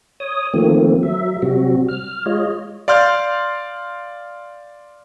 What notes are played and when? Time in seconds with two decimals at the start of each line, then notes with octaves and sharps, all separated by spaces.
0.20 C#5 D#6
0.54 D#3 F3 A3 A#3 C4
1.03 F#3 E5
1.42 C3 F#3 G3 C4 F#4
1.89 F6
2.26 G#3 F4 C#5 D#5
2.88 D5 F5 C6 F6 G6